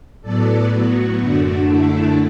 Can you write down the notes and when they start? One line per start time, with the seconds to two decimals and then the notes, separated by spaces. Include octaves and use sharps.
0.22 A2 F#3 B3 A4 D5
0.70 F#4
1.19 F#2 D3 A3 D4
1.67 E4 A4